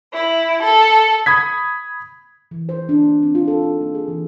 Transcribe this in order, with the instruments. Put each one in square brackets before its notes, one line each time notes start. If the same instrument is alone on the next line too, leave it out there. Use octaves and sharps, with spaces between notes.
[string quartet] E4
A4
[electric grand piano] B5 D#6 G#6 B6
[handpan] E3
C5
D4
A#3
C4
F4
A4
D#4
A#3
G#4
E3